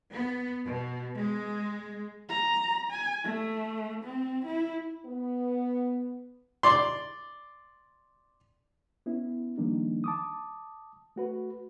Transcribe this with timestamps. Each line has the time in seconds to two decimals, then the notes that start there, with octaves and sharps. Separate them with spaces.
0.13 B3
0.65 B2
1.17 G#3
2.29 A#5
2.91 G#5
3.24 A3
4.04 C4
4.45 E4
5.06 B3
6.63 D5 C6
9.06 B3 C#4 E4
9.58 D#3 F3 G3 A#3 D4 D#4
10.04 A5 D6 D#6
11.16 A3 F#4 B4